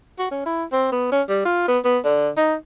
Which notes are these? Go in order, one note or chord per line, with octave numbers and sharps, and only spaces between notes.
F#4
C#4
E4
C4
B3
C#4
G3
F4
B3
B3
D3
D#4